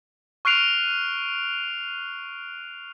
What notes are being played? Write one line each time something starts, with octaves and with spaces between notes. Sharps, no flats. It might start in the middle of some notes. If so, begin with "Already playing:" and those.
C#6 F6 F#6 C7 D7 F7